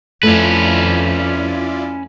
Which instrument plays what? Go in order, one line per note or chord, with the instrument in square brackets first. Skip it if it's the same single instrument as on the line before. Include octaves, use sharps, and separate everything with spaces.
[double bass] F2 [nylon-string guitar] A3 [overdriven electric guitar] C#4 B4 [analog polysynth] E4 F4 D5